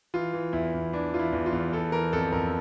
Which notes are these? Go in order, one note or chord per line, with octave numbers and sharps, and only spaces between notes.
E3 F4
E3
E2 E4
E2
E3 D4
E3 F4
E4
E2
F4
E2
E3 A4
E3 A#4
F2 A4
F2 A#4